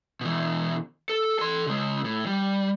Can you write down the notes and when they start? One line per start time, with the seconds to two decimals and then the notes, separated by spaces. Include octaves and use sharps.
0.21 B2 E3
1.10 A4
1.39 A4 C6
1.66 C#3 G#3
2.04 A2
2.26 G3